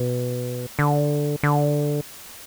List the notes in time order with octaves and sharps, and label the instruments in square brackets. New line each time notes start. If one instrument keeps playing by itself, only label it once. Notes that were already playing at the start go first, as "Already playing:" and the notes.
Already playing: [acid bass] B2
D3
D3